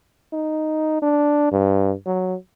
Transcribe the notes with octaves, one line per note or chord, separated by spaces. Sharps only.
D#4
D4
G2
F#3